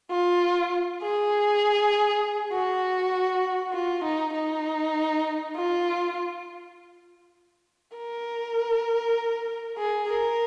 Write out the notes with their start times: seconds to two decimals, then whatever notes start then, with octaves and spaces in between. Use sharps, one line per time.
0.11 F4
1.03 G#4
2.53 F#4
3.74 F4
4.05 D#4
4.34 D#4
5.56 F4
7.97 A#4
9.79 G#4
10.09 A#4